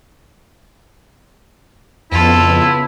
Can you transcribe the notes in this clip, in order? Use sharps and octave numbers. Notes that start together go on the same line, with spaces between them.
F2 C#3 B3 E4 F4 A4